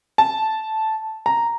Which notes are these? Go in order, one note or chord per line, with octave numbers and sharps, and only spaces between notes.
A5
A#5